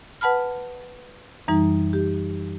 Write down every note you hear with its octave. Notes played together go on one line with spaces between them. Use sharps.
B4 F#5 A5 B5 F6
F#2 E3 G3 D#4
G4